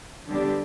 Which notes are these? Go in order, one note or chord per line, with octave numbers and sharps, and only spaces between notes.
D3 G3 B3 D4 G4